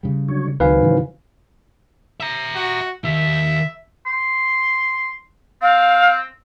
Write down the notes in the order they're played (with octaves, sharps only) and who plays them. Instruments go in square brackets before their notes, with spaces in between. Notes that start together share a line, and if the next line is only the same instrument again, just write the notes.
[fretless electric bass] C#3 G3
[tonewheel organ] D3 F#3 C#5
[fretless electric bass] C#2 [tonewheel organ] D#3 F#3 C4 [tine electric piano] B4 F5 G#5
[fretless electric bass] G#2 C#3 E3
[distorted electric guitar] E5 A#5
[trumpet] F#4
[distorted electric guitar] D#3 G4 [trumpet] E5
[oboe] C6
[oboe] C4 [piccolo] F5